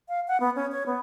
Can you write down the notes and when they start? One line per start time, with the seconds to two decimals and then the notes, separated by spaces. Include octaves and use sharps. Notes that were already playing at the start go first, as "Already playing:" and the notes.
0.09 F5
0.28 F#5
0.40 B3
0.56 C#4
0.72 C#5
0.86 B3